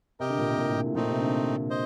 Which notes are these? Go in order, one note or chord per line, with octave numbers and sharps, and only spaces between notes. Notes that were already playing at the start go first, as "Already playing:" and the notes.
C3 G4 A#4 D#5 G5
D3
A#2
C3
A#2
A2
A#2
A2
A#2 A3 C4 D#4
C3
D3
C5 D#5